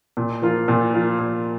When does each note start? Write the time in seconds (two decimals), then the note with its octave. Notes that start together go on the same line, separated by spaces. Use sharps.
0.17 A#2
0.42 F3 A#3 F4
0.68 A#2
0.94 F3 A#3 F4
1.19 A#2